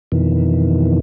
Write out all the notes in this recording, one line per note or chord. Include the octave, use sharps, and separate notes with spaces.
F2 B2 D#3 E3